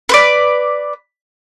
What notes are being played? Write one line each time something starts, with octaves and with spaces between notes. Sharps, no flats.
B4 C5 D5